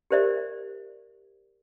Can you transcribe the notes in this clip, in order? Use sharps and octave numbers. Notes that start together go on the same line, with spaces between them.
G4 A#4 C5 D5 E5